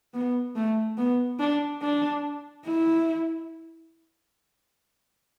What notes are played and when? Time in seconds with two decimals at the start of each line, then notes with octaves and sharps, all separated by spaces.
0.14 B3
0.55 A3
0.97 B3
1.39 D4
1.81 D4
2.65 E4